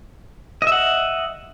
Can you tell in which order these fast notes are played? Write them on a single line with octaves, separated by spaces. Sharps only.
D#5 E5 F#5